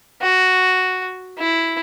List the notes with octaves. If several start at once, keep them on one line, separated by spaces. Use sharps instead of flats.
F#4
E4